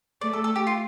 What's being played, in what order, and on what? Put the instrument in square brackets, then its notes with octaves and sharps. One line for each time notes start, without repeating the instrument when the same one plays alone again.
[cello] A3 [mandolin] D5
[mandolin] A4
A4
G4
F4